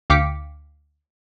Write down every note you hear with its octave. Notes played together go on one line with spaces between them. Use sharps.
D2 F5 G5 D6 B6 C#7